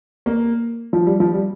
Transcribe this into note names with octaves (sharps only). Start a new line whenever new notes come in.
A#3
F3
G3
F3
G3